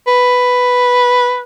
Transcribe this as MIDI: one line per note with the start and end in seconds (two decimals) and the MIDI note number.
0.07 1.42 71